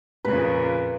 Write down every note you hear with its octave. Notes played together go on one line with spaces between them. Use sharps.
F2 A#2 C#3 B4